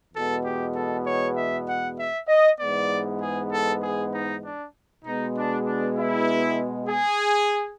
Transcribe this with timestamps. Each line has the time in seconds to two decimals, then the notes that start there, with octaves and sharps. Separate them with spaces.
0.13 E2 B2 G#3 B3 A4
0.44 G4
0.75 A4
1.06 C#5
1.36 E5
1.67 F#5
1.98 E5
2.28 D#5
2.59 G#2 E3 G#3 B3 D5
3.21 G#4
3.52 A4
3.82 G#4
4.13 D#4
4.44 D4
5.05 B2 G#3 B3 D#4
5.36 D4
5.66 D4
5.97 E4
6.89 G#4